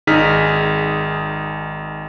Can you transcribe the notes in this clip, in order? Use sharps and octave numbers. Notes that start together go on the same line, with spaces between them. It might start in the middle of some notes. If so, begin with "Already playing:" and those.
G#1 D#4 G#4 F6 B6